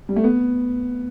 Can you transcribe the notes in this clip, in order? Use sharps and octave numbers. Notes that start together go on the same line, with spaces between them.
G3
A3
B3